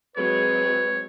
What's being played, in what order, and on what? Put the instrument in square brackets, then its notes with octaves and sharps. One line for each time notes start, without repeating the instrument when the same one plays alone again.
[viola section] F#3 G#3 C4 [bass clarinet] B4 [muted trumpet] C#5